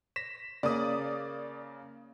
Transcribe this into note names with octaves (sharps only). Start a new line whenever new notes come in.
A#6 B6 E7
C#3 A#3 D5 D#6